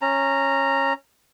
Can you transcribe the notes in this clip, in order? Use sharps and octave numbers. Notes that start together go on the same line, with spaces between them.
C#4 A#5